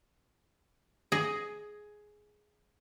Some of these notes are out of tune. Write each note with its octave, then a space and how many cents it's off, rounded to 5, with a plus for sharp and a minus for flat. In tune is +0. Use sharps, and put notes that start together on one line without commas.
G#4 +10 D#5 +0